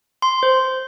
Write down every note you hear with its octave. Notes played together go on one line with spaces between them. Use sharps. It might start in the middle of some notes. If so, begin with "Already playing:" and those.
C6
C5